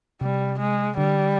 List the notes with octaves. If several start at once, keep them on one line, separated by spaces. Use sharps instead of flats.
C3 G3
G#3
D3 G3